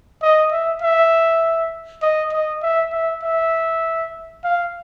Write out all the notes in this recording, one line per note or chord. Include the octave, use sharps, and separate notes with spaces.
D#5
E5
E5
D#5
D#5
E5
E5
E5
F5